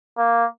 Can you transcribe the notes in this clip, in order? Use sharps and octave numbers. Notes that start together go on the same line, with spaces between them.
A#3